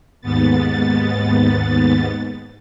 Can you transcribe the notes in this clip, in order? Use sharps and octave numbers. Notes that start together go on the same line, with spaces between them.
D#2 G#2 B3 A6